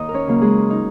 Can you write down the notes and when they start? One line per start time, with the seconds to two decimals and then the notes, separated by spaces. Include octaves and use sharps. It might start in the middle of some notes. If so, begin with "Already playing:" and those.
Already playing: D#2 D#4 D#5
0.09 A#4
0.14 C#4 C#5
0.27 C#3 F#3 A#3
0.41 G#3 G#4
0.70 D#4